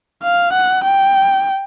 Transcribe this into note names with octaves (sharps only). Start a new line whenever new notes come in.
F5
F#5
G5